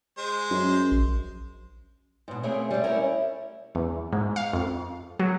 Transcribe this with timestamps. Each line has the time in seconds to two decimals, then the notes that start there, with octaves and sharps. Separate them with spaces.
0.18 G#3 C5
0.51 F#2
0.92 A#1
2.28 G#2 B2
2.43 A3 A#3 C4 C#4 G#4
2.70 G3 A3
2.84 C#4 E4 A#4
3.75 E2
4.12 G#2
4.36 F5
4.53 F2
5.19 F#3